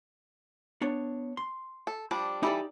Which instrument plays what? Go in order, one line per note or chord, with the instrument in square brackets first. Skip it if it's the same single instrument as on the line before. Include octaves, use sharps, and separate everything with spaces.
[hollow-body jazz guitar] B3 D4 C#5
C6
[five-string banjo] A4
F3 G3 D4
[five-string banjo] E3 G3 A4 [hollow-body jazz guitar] D#4 G4 D5